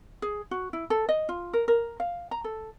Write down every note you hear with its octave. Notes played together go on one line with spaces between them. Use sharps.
G#4
F#4
E4
A4
D#5
F4
A#4
A#4
F5
A#5
A4